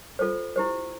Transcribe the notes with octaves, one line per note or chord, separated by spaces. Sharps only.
F4 A4 C5
E4 G4 C5